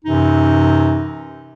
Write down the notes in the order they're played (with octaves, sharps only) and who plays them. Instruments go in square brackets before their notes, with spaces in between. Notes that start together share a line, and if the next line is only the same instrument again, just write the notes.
[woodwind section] F#2 C3 E3 D#4